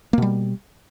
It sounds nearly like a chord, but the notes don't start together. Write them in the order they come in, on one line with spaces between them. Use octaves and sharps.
A#3 B2 G3